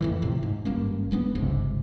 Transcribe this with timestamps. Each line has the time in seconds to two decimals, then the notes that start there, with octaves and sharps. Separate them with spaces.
0.01 F2 A2 E3
0.22 A2 C3
0.43 G#2
0.65 G#1 G2 A#3 C#4
1.11 F1 G#3 B3 D4
1.35 G1 C#2 G#2 C3